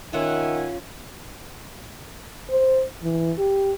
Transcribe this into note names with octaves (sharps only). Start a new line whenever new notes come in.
D#3 C#4 F4 E5 F#5 G#5
C5
E3
G4